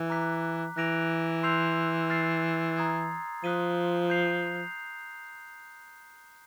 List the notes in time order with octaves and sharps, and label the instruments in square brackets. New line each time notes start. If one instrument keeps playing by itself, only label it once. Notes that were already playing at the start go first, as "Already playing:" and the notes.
Already playing: [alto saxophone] E3
[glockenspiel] A#5 D6 F#6 B6
[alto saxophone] E3 [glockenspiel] F#6 A#6 D7 F7
[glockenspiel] C6 E6 G6 C7 F7
F6 A6 C7
A#5 D#6 G#6
[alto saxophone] F3 [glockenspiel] D#6 F#6 B6 D#7
[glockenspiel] G6 C7 F7